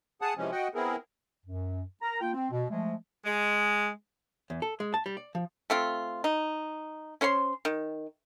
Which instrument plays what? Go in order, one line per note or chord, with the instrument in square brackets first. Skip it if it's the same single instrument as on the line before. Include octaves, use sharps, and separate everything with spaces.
[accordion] G#4 F#5 A5 D#6
C3 E3 F3 G#3 C#4
F#4 D#5 F#5 G5
B3 C4 E4 G#4 A#4
[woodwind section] F#2
A#4 A#5
A#3 F4 G5
C4
B2
F3 G#3 A3
[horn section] G#3
[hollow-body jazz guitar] E2
A4
G#3
A5
G3
D5
F3
[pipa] A3 C4 F4
D#4
C#4 C5 C#5 C6
D#3